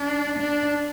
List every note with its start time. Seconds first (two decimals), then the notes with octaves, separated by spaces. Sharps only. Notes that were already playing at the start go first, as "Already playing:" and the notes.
Already playing: D4
0.38 D4